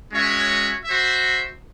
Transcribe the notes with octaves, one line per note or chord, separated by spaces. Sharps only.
G#3 C#4 F#4 C#5 E5
F#4 C5 E5